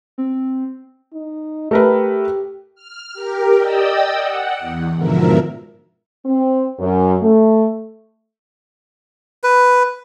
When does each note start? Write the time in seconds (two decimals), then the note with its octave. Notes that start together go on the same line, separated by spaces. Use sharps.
0.18 C4
1.13 D#4
1.71 A3 G4 A#4 B4
2.75 F6
3.13 G4 A#4
3.58 D5 D#5 G5 D#6 E6
4.14 F#5
4.59 E2
4.95 G#2 B2 D3 F3 A#4 E5
6.26 C4
6.79 F#2
7.21 A3
9.44 B4